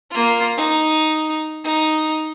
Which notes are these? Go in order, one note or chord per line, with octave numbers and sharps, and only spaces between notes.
A#3 F4
D#4
D#4